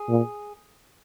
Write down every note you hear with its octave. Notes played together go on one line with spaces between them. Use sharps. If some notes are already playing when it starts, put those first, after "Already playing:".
Already playing: G#4
A#2